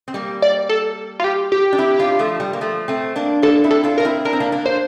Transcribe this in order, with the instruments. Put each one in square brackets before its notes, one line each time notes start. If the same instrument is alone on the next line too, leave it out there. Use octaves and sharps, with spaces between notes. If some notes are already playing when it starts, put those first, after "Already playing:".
[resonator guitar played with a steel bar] C4
G3 A#3
[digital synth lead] D5
A4
F4
G4
G4
[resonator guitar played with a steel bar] D4
C4 E4
D4 F4
F3 A3
G3
A#3
F3 A3
A3 C4
A#3 D4
[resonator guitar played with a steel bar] A#3 D4 [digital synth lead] A4
[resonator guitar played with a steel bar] C4 E4
[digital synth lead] A4
[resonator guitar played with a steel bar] D4 F4
[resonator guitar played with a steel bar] F4 [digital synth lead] A#4
[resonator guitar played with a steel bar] C4 E4
[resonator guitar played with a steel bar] D4 [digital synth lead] A#4
[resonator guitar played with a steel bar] C4
A#3 D4
A#3 D4
[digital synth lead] C5